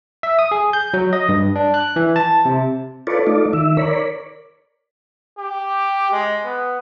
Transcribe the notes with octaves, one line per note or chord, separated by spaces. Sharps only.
E5
D#6
G#4
G6
F#3
D#5
G2
D4
F#6
E3
A5
C3
F4 A4 B4 C#5 D5
A3 D#4 F4 D5
D#3 E5
A#4 C#5 D5 B5
G4
G#3
B3